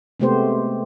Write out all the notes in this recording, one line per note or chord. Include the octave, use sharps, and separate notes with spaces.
C3 G#3 A3 B3 G4 C5